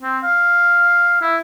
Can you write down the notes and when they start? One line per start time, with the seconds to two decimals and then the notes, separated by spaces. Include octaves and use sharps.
0.01 C4
0.23 F5
1.21 E4